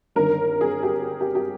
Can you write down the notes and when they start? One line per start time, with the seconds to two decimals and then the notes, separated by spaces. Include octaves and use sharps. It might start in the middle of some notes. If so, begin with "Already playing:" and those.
0.16 G1 G2 D#3 A#4
0.61 G#4
0.83 G4
1.21 G4
1.35 G4